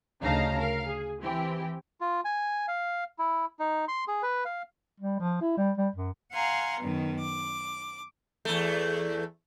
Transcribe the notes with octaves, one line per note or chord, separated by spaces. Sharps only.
D2 C#3 D#4 F5 A5 A#5
A#4 F5
G#4
E3 C4 E4 G4
F4
G#5
F5
E4
D#4
C6
G#4
B4
F5
G3
F3
E4
G3
G3
F#2
F5 F#5 G#5 A#5 C6
F#2 B2 D#3
D6
E2 A3